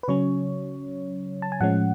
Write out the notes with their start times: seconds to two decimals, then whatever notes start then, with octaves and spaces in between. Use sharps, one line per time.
0.03 B4
0.08 C#3 F#3 C#4 C#5
1.42 A5
1.52 G#5
1.60 A2 F3 G#3 C#4 F#5